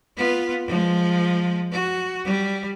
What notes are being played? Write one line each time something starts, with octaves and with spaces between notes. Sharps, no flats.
B3 F4
F3 G#3
F#4
G3